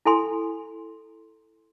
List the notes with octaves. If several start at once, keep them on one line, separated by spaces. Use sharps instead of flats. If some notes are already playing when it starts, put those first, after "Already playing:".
E4 A4 G#5 C6